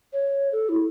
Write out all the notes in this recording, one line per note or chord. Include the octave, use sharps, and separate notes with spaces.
C#5
A4
E4